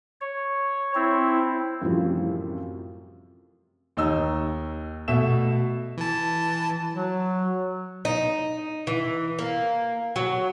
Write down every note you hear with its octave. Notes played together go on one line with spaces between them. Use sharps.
C#5
C4 E4
F#2 A2 C3 E3 F3 G3
D#2 D#4 E6
B2 A3 E5 E7
E3 A5
F#3
D#4
E3
A#3
F#3